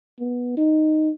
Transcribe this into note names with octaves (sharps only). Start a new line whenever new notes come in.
B3
D#4